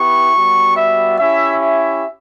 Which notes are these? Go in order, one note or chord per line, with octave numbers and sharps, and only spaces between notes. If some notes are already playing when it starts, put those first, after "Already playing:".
Already playing: B3 E4 G4 C#6
G3 B3 F#4
E5
C#4 E4 G4 E5
E5